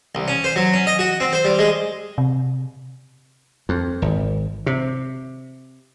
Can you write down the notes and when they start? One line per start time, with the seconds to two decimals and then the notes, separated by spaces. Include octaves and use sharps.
0.15 C2
0.28 C#4
0.44 C5
0.56 F#3
0.74 C#4
0.87 D#5
0.99 F#4
1.20 C4
1.33 C5
1.45 G3
1.59 G#3
2.18 C3
3.69 F2
4.02 G#1
4.66 C3